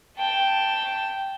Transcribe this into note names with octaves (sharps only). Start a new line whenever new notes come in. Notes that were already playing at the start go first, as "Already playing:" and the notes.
G5 A5